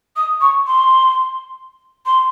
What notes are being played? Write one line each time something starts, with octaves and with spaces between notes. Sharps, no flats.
D#6
C#6
C6
C6